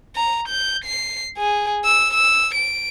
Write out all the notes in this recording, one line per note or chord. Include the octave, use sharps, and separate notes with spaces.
A#5
G6
C7
G#4
E6
E6
D7